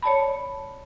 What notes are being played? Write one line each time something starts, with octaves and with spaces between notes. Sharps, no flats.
C#5 D5 A5 B5